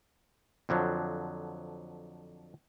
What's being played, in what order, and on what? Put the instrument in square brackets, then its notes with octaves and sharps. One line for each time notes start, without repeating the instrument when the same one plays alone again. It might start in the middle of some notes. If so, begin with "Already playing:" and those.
[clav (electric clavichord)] F2 D3 F3 F#3